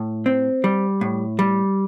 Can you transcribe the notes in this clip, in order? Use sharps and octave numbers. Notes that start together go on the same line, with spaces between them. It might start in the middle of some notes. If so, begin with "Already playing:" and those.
Already playing: A2
C4
G3
A2
G3